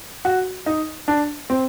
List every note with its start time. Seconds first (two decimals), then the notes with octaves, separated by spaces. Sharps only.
0.25 F#4
0.66 D#4
1.08 D4
1.50 C4